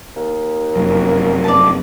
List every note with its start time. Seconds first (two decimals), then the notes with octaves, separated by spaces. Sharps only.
0.16 D#2
0.76 F1 F#2
1.44 D5 A5